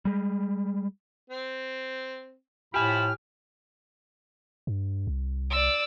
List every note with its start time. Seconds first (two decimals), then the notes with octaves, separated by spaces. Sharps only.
0.05 G3 G#3
1.30 C4
2.74 A2 F3 E4 G4 G#5 B5 F6
4.67 G2
5.07 C2
5.51 D5 E6